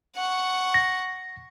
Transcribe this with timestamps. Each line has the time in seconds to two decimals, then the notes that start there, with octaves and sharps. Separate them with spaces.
0.16 F#5 C#6
0.74 A#6